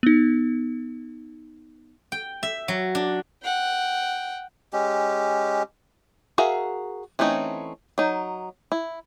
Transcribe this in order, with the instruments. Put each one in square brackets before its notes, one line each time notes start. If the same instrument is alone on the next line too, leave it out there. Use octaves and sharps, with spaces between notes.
[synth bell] B3 D#4
[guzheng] G5
E5
F#3
D4
[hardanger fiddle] F#5 G5
[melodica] G#3 C#4 G4
[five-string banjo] F#4 G#4 A#4 E5 F5
E3 A3 C4 C#4 D#4
F#3 D#4
E4